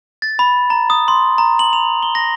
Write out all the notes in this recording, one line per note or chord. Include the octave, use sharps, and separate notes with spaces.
A6
B5
A#5
D#6
C6
A#5
F#7
F7
G7
A#6